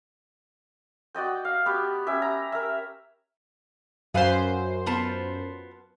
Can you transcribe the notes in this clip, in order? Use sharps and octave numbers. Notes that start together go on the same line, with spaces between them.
F#4 D5 D#5 G5
F5
B3 F#4 G4
C#4 G4 E5
A#5
A#4 E5
F#2 B4 C5 F5 G#5
B3 F4 A5